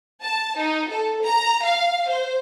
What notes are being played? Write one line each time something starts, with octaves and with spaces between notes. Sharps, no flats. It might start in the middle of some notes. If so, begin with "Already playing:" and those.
A5
D#4
A4
A#5
F5
C5